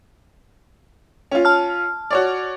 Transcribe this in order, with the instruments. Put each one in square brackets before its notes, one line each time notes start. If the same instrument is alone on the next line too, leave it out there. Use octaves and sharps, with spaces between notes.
[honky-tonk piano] C#4 F4
[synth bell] A5 F6
[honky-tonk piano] F#4 C#5 D5